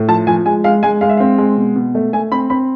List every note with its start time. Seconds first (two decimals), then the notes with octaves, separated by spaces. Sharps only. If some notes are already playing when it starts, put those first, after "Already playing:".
Already playing: A2
0.08 F3 A5
0.27 F3 G#5
0.46 G#3 G#5
0.64 G#3 F5
0.83 G#3 G#5
1.01 G#3 F5
1.09 E5
1.17 C4 F5
1.38 G#3
1.57 B2
1.76 B2
1.95 A3
2.13 A3 G#5
2.32 C4 B5
2.50 C4 B5